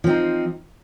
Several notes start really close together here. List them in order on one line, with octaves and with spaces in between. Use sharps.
F3 C4 D#4